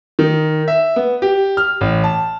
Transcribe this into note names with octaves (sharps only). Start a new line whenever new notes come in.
D#3
E5
B3
G4
F6
A1
A5